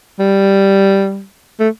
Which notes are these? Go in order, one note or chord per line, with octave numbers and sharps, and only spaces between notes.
G3
A3